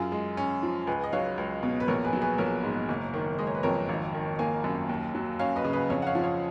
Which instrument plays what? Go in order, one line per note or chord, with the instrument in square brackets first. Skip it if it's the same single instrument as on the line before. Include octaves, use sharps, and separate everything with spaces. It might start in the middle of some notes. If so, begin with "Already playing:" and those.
Already playing: [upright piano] F#2 F4 G#4
G#3
C#4
F3
C#2 G#4 B4
D#5
F#3 C#5 F5
C#2
B2
B4
A#1 A#4 C#5
G#4 B4
F#3
G#4 B4
A#1 A#4 C#5
G#2
F#1
D#3
G#3 D#5
C#5
B4
F2 A#4 C#5
G#1
D#3
A#3 F5 G#5
F#2
D#2
F#3
C#4 C#5 F5
B4 D#5
C#3
B4 D#5
F2 C#5 F5
F#5
C#5 F5
F3
C#5 F5